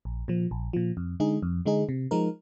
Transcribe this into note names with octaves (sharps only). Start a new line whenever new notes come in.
A#1
A#2 F3
A#1
A#2 F3
F2
D3 G#3 D#4 G#4
F2
D3 G#3 D#4 G#4
C3
F3 G#3 D#4 A#4